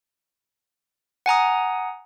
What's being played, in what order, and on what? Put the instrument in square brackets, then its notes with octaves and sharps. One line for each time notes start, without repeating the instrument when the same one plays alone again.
[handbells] F#5 G#5 A#5 D#6